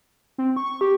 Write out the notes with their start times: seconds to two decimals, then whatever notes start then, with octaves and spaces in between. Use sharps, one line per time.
0.38 C4
0.56 C#6
0.81 G4